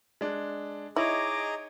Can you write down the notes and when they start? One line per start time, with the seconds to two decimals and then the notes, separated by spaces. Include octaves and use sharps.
0.21 G#3 D4
0.96 D#4 E4 G#4 C#5 D#5 A#5 D6